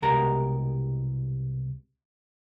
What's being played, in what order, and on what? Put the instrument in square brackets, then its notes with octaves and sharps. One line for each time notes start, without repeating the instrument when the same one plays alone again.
[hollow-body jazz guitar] C2 B2 G#3 G4 A#4 A#5